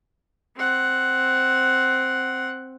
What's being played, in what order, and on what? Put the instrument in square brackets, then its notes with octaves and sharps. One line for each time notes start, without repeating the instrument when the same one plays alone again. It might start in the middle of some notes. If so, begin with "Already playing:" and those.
[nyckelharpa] C4 F#5